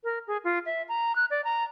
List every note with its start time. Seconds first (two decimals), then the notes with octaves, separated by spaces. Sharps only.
0.04 A#4
0.27 G#4
0.44 F4
0.66 E5
0.89 A#5
1.16 F#6
1.31 D5
1.44 A#5